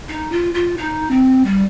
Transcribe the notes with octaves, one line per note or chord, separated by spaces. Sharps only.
D#4
F4
F4
D#4
C4
G3